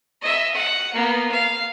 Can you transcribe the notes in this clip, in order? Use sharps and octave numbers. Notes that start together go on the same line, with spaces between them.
D#5 E5
F#5
A#3 B3
F5